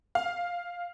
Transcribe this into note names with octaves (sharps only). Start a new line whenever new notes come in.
F5